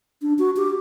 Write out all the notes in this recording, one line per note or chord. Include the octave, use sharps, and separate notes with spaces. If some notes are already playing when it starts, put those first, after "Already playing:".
D4
F#4
G4